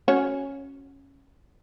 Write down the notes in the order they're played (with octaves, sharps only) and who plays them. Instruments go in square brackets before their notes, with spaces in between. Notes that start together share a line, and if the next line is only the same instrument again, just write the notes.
[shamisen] C#4 F#4 C#5